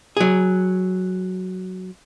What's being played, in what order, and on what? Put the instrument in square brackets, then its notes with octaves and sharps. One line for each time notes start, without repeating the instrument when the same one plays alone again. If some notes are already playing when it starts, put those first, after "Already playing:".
[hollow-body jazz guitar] F#3 G#4